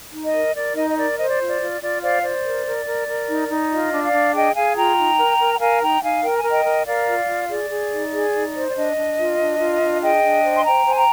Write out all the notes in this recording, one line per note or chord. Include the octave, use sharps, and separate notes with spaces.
D#4
D#5
A#4
A#4 D5
D#4 D#5
D#5
A#4 D5
C5 D#5
D5
F4
D5
F4
F4 D5
C5 D5 F5
C5 D5
A#4
A#4
A#4
A#4
D#4
D#4
F4 D#5
D4
D5 F5
D4
G#4 D#5 G5
G#4 F5 G#5
F4 G5 A#5
D#4
A#4
A#4
G5
A#4 F5 G#5
D#4 G5 A#5
D#4 F5 G#5
A#4 G5
G#5
A#4 D#5 G5
A#4
A#4 D5 F5
F4
F4
G#4 D5
G#4
D#4
G#4
D#4
C5
D5
D4 D#5
D4
F4
D4
F4
D4
G#4 D#5 G5
D4
C5
C6
C5 G5 A#5
C5 G#5
G5 A#5